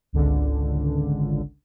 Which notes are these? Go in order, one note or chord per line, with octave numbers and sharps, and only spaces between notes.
G#1 C#2 D3